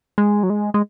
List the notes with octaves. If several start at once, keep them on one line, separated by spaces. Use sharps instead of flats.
G#3
F#3
G#3
G#3